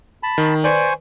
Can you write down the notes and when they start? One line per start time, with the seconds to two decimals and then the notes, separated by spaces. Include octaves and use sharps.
0.23 A5 B5
0.38 D#3
0.64 B4 C5 D5 G#5 C#6